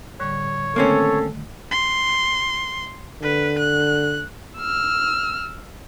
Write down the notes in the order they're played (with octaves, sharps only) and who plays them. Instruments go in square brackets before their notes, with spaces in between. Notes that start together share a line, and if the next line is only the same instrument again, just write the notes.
[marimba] A2 D3 G3 [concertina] C#5
[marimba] D3 D#3 A3 [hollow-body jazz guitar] A#3 C4 C#4 [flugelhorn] A4
[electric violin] C6
[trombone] D3 [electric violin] B4
[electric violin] F#6
E6 F6